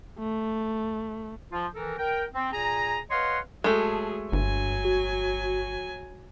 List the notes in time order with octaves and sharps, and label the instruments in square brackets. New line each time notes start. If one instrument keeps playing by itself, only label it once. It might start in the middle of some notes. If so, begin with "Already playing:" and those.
[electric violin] A3
[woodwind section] F3 F4
D#3 E3 A4 A#4
A#4 G5
C4
A#2 G#4 G#5 A#5
B4 C#5 D#5 F5 F#5 C6
[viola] F#3 G#4 [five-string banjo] G#3 A3 [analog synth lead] A5
[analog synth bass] G1 [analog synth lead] G2 [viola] F#3 G#5
[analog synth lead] F#4